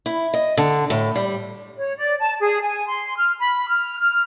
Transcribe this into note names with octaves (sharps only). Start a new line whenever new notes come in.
E4
D#5
D3
A2
G3
C#5
D5
A5
G#4
G#5
C6
F6
B5
F6
F6